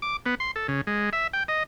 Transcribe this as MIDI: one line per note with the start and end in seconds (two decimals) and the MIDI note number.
0.02 0.17 86
0.26 0.35 59
0.40 0.51 84
0.56 0.67 69
0.68 0.81 49
0.87 1.10 56
1.13 1.27 76
1.33 1.43 79
1.48 1.63 75